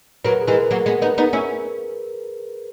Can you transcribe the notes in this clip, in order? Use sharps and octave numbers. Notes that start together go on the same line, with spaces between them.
F#3 A#3 B4
A#4
G#4
E3 G#3 A#4
F#3 A#3
G#3 B3
B3 D#4
B3 D#4
C#4 E4